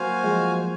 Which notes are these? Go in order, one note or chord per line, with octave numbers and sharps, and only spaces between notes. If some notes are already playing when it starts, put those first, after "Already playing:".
Already playing: F#3 A#3 F#4 C5 F5 G#5
F3 G#3